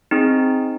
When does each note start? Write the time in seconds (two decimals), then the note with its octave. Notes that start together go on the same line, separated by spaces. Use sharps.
0.11 C4 D#4 G#4